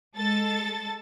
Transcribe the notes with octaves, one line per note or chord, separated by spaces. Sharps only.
G#3 A4 A6